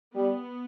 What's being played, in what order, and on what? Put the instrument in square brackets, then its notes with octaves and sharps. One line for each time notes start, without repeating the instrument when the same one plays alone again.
[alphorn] G3 [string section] B3